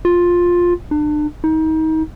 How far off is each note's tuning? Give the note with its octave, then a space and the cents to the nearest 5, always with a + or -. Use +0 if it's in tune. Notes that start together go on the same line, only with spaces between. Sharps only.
F4 +10
D4 +35
D#4 +30